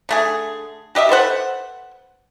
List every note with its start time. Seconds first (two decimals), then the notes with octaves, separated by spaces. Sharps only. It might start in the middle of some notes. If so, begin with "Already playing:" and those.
0.09 D3 A3 G#4
0.95 F#4 G4 D#5 E5
1.09 A4 B4 C5 F#5